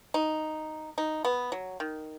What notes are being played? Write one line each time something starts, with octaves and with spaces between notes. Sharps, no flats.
D#4
D#4
B3
F#3
D#3